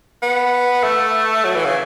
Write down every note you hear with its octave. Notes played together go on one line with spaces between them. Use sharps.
B3
A3
F#3
E3
C#3